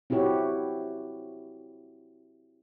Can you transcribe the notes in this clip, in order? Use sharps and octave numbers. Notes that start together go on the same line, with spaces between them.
C4 E4 F#4 G4 C#5